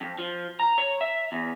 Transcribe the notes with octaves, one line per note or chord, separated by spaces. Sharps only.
F2
F3
A#5
C#5
E5
E2